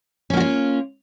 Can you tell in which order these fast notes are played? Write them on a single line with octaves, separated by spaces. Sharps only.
C#4 A#3 F#4 F4